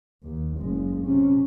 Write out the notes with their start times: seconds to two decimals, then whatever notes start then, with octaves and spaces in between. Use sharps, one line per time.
0.23 D#2
0.58 F#1 G#3
1.01 C3 C#4